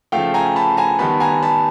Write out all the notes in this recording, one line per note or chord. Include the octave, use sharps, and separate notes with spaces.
C#3 F3 A3 F5 G5
G#5 A#5
A5 B5
G#5 A#5
D#3 G3 B3 A5 B5
G#5 A#5
A5 B5